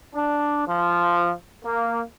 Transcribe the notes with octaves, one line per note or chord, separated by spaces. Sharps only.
D4
F3
A#3